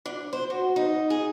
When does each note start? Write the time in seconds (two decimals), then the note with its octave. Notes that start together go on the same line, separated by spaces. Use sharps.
0.06 D4
0.33 C5
0.50 F#4
0.76 D#4
1.10 G#4